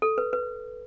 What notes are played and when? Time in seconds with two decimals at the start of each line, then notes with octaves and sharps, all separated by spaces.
0.02 A4
0.18 B4
0.33 B4